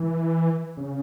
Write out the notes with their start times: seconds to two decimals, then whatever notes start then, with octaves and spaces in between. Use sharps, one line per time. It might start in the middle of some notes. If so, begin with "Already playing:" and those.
Already playing: E3
0.77 C#3